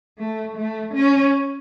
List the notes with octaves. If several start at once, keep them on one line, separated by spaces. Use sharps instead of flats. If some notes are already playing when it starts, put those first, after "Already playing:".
A3
A3
C#4